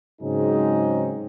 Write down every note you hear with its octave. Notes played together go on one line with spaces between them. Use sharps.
G#2 C#3 F#3 C4 D#4 G#4